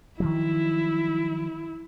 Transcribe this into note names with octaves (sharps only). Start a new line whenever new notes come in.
D#3 F3 F#3 E4